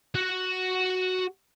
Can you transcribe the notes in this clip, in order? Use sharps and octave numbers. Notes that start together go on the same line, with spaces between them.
F#4 F#5